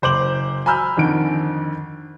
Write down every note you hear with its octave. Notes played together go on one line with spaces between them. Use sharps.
F#1 C5 D6 F#7
G#5 A#5 B5 E6 F6 G6
F2 D3 D#3 D7